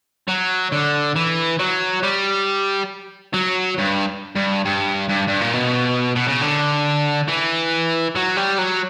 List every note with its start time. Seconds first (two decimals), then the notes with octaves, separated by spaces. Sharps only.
0.28 F#3
0.72 D3
1.16 E3
1.59 F#3
2.03 G3
3.34 F#3
3.79 G2
4.36 G2
4.65 G2
5.09 G2
5.27 G2
5.41 A#2
5.54 B2
6.16 B2
6.28 C#3
6.41 D3
7.28 E3
8.16 F#3
8.37 G3
8.59 F#3